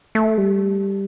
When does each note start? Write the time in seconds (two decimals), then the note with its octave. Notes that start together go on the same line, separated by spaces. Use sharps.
0.15 A3
0.38 G3